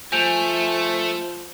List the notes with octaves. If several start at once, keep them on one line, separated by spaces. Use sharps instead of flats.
F3 A3 G#5 G6 D7 F7